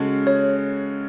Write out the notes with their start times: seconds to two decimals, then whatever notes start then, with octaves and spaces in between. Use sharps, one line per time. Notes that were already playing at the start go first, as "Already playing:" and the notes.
Already playing: C#3 G#3 C#4 F#4 A4
0.27 C#5